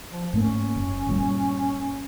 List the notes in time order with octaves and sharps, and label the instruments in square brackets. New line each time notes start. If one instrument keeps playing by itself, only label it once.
[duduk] F3
[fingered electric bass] G#2 A3 A#3 [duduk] C#4
[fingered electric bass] F#1
G1 A#2 G3